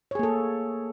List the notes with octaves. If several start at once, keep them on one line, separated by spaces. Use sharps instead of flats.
A#3 G#4 A4 C#5